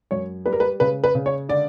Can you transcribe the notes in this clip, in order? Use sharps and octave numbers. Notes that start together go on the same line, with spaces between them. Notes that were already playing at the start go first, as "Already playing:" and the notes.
F#2 C#5
G3 B4
A#4
B4
C#3 B4
B4
C#3
C#5
D3 D5